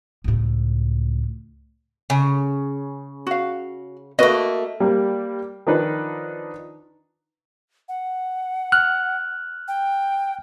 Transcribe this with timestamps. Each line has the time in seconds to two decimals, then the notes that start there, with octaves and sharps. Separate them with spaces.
0.24 C#2 A2
2.10 C#3
3.27 F#4 F5
4.19 A3 A#3 F#4 B4 D#5
4.80 G3 A#3
5.67 D#3 F3 D4 D#4 B4
7.89 F#5
8.72 F6 F#6
9.68 G5